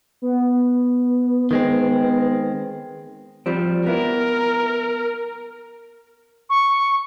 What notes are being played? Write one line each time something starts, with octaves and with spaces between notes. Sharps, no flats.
B3
D#3 G#3 C4
F3 G3 C4
B3 E4 A#4
C#6